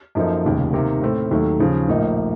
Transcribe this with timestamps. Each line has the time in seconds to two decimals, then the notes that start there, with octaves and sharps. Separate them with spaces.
0.15 F#2 F3 A#3 D#4 A4
0.45 F1 D#2 C#3
0.73 C3 D#3 A#3
1.02 A2 A3 C4
1.31 D#2 D#3 F#3 A3
1.59 D#2 C#3 F3
1.89 A#1 A2 F3 A#3 D#4